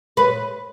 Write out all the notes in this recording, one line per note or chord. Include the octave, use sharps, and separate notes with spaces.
B4